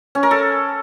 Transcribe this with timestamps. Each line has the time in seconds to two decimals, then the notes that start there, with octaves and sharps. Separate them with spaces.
0.15 C#4
0.23 A#4
0.31 A4